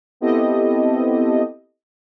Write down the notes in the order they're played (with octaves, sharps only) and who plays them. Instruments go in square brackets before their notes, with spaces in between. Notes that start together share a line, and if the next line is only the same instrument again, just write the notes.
[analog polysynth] B3 C4 E4 G4 A4 D#5